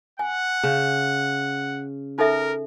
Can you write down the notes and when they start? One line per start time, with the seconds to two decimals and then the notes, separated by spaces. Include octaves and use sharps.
0.19 F#5 G#5
0.63 C#3
2.19 D#4 A4 A#4 E5